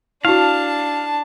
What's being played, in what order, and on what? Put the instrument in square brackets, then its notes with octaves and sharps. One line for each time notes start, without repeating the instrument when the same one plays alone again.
[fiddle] D4 A5 [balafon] E4 F#4 [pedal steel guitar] F5